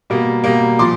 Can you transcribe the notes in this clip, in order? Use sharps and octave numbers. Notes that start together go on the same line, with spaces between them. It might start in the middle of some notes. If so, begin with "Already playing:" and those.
B2 G3 A#3
B2 G3 A#3
A#2 F3 C6 D6